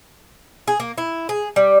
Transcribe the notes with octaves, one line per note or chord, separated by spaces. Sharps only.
G#4
A#3
E4
G#4
G3